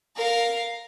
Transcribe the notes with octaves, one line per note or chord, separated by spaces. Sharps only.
A#4 F5